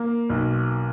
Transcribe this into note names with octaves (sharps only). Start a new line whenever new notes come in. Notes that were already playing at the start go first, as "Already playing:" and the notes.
Already playing: A#3
B1